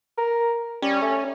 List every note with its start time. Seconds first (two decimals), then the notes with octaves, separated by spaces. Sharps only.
0.18 A#4
0.82 G3 C#4
1.02 A3